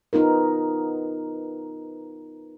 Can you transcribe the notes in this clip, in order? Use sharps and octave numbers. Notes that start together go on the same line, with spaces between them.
B3 D#4 F4 A#4